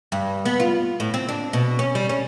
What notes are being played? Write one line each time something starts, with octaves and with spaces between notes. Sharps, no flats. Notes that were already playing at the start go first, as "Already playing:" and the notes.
G2
B3
F4
A2
C4
D4
B2
C#4
G3
C#4